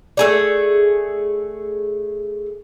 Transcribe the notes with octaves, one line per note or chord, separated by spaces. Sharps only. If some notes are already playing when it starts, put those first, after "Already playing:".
A3 G#4 D5